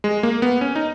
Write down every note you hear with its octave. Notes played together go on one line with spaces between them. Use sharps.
G#3
A#3
B3
C#4
D#4